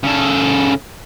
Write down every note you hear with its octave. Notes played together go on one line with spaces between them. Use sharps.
C#3 A4